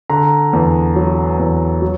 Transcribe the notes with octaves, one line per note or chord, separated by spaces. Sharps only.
D3 A#5
E2
F#3
E2
F#3